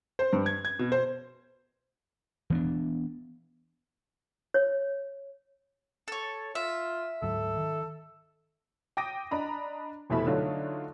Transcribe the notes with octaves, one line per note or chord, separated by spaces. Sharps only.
C5
G2
G#6
G#6
B2
C5
E3 B3 D4
C#5
A4 C#5
F4 E5
D2 G#2 F#3 A4
D#3
G5 D6 D#6 A#6 D7 D#7
D4 D#5 A#5 B5
F1 B2 E3 A3 E5 B5
D3 F#3 A3 D4 D#4 F4